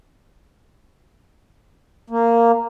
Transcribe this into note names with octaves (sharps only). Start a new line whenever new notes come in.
A#3